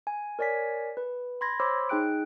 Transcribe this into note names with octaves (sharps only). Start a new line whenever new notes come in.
G#5
A#4 C#5 D5 G#5 B6
B4
B5 C6 G#6 A#6
C5 C#5 B5 C6 D6 E6
D#4 G#4 G5 F#6 D7